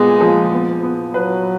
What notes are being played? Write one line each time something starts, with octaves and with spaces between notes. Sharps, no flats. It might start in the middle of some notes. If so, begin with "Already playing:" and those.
Already playing: A#2 G#3 B3
F3
B3
B3
F#3 B4